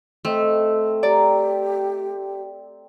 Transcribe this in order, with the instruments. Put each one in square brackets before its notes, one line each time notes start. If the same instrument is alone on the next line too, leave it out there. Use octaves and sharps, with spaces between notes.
[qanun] A3 [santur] C4 D#5 E5
[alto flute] G4 [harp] D5 [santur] A#5